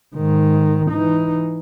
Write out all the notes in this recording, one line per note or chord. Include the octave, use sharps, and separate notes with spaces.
G#2 D#3
E3 D#4